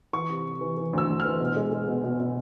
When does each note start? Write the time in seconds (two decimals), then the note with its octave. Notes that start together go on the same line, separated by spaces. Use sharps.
0.13 E3 C#6
0.30 C3
0.46 C3
0.61 E3
0.77 E3
0.93 D2 E6
1.08 D2
1.20 F6
1.25 E3
1.40 B2
1.56 G#3
1.72 G#3
1.88 B2
2.04 B2
2.20 B2